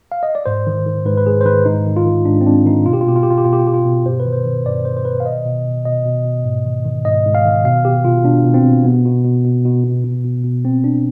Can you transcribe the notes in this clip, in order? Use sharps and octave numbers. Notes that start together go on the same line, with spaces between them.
F5
D#5
D5
G#2 C5
D#3
D#3
G#2 B4
B4
G#2 G#4
C5
D#3 B4
G#2 D#4
D#3
F4
D#3
G#2 D4
C4
G#2 D4
D#3 D#4
B2 F4
G4
F4
B2 G4
F4
B2 G4
F4
G4
B2 F4
G4
F4
B2 G4
F4
B2
G2 C5
B4
D#3
C5
D#3
G2 D5
G2 C5
C5
D#3 B4
F5
B2 D#5
B2
B2
B2 D#5
B2
B2
G#2
D#3
D#3
G#2 D#5
G#2
F5
D#3
B2 F5
B2 G4
B2 F4
B2 D4
B2
C4
B2
B2 B3
B2
B2
B2
B2
B2
B2
B2
B2
B2 C4
B2 D4